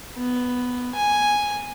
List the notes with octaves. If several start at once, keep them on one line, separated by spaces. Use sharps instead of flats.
B3
G#5